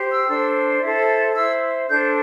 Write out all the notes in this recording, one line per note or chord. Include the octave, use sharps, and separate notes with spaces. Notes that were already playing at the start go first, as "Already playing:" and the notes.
Already playing: G4 C5
E6
D4 A4 C5
E4 A4 C5
E4 C5 E6
D4 A4 C5 G6